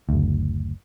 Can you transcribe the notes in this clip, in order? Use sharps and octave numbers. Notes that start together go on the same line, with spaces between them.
F#1 D2